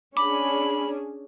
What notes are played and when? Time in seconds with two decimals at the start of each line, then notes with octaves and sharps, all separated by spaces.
0.17 C#4 D4 G#4 B5 D6